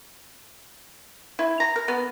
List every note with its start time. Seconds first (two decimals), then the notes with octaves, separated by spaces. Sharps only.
1.39 E4
1.60 A#5
1.76 A#4
1.88 B3